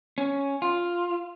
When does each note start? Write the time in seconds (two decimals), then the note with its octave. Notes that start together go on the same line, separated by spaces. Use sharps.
0.18 C#4
0.62 F4